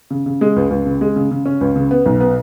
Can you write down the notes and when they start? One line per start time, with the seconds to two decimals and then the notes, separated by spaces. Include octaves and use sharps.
0.11 C#3
0.26 C#3
0.41 G#3
0.56 C#2
0.70 C#2
0.86 C#3
1.01 G#3
1.16 C#3
1.31 C#3
1.46 C#4
1.61 C#2
1.76 C#3
1.91 B3
2.06 B1
2.20 B3